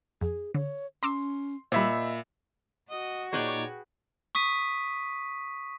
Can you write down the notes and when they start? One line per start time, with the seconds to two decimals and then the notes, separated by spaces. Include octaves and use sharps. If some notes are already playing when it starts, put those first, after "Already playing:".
0.21 F2 G#4
0.54 D3 C#5
1.03 C#4 A#5 C6 D6 E6
1.72 A#2 G3 E4 C5 D#5 E5 B5
2.90 F#4 D#5
3.33 A#2 D#4 G#4 B4 C#5 D5 G5 D6
4.35 C#6 D#6 B6 D#7